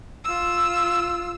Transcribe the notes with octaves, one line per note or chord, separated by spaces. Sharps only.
F4 E6